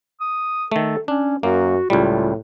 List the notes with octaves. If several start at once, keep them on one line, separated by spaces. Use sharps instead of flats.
D#6
D#3 A3 A4
C#4 D4
F#2 A#3 F#4
C#2 A2 G3 F4